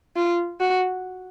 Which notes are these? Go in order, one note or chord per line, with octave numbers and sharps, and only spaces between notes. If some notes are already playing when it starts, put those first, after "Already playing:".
F4
F#4